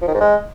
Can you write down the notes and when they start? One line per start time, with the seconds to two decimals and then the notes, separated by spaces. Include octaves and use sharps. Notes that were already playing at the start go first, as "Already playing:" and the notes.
0.02 F3
0.08 D#3
0.14 G#2
0.20 G#3